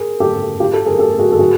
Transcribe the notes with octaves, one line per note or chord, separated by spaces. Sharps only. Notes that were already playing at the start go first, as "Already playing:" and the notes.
Already playing: G#4 A#4
G4 A4
F4 G4
G4 A4
G#4 A#4
G4 A4
F#4 G#4
A4
F#4 G#4